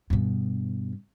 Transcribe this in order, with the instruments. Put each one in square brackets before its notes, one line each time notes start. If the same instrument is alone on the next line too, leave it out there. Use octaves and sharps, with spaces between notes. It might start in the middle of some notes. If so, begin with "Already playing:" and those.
[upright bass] G2 B2